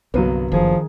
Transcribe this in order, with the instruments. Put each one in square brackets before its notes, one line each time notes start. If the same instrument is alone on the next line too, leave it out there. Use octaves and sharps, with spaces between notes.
[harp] G1 A#3 D#7 [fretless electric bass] C2 [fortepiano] F#3 B3
[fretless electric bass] F#1 [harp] D#3 G#4 [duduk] F3